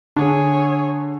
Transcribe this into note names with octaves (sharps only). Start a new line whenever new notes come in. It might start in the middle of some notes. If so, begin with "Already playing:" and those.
D3 D4 G#4 C#5